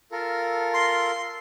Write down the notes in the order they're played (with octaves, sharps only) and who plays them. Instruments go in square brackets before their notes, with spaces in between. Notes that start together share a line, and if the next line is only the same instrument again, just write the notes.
[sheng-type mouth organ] F4 A4 A#4
[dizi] C6